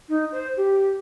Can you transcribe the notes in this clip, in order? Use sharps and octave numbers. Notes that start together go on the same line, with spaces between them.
D#4
C5
G4